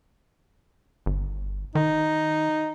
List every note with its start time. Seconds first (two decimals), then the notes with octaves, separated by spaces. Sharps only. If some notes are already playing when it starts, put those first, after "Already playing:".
1.06 G1
1.75 D#3 D#4